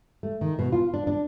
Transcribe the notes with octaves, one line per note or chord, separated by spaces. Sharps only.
A3
D#3
B2
F4
D4
D4